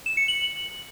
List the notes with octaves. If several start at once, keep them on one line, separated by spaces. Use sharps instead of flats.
E7
C#7
F#7